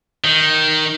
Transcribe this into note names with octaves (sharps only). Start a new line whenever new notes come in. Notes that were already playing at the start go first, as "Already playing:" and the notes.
D#3